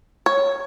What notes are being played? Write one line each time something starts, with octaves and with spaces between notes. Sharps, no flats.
C#5